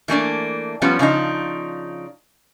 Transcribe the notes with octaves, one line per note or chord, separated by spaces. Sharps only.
E3 A3 A#3 D4
F3 G3 B3 C#4
C#3 F3 D4 D#4